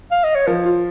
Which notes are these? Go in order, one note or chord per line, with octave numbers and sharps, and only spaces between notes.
F5
D#5
C#5
F3 A#4
F4